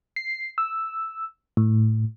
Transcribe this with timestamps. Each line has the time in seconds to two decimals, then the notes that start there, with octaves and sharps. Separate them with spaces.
0.16 C7
0.58 E6
1.57 A2